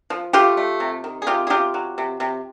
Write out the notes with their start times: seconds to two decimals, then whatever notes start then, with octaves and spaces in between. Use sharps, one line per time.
0.10 F3
0.33 A3 F4 G4
0.57 A3
0.80 C3
1.04 D#3
1.22 G#4
1.27 C3 F4 G4
1.47 G#4
1.50 C3 F4 G4
1.74 F#3
1.98 C3
2.20 C3